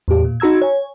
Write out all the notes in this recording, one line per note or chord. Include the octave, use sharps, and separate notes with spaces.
E2 A2 G4
A#2
D#4 F#4 A#5 E6 G#6
C#5 G#5